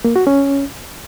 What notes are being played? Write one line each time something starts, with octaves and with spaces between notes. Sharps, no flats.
A#3
F#4
C#4